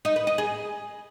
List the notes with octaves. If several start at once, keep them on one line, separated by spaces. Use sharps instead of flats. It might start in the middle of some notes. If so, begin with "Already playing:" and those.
D#4
B4
D#5
G#4